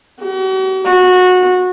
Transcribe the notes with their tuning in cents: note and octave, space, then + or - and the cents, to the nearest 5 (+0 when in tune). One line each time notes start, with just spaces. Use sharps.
F#4 +45
F#4 -20